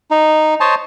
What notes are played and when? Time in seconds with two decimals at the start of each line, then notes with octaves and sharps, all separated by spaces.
0.11 D#4
0.60 C5 C#5 D#5 A5